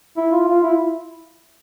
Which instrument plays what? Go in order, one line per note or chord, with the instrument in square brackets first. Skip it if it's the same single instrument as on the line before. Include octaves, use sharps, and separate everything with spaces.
[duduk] E4
F4
F4
E4